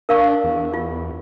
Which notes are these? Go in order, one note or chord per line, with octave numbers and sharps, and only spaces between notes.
D4 A#4 F5 C#6
E2
F4